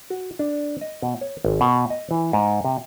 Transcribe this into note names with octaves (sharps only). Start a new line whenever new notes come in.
F#4
D4
D#5
B2
C#5
G#1
B2
D#5
E3
G#2
C3